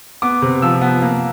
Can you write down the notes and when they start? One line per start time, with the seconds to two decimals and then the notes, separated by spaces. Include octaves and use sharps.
0.22 B3 D6
0.42 C3
0.62 F3 E6
0.81 B3
1.02 A#3